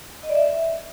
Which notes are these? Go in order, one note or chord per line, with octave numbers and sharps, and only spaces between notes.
D#5
D5
E5